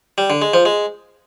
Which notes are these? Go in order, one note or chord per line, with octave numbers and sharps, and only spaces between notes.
G3
D3
G#3
F3
G#3